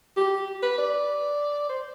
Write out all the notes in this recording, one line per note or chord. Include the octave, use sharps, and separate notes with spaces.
G4
B4
D5
C5